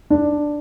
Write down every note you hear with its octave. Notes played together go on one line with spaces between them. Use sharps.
D4